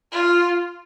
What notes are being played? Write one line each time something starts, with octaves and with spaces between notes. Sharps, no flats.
F4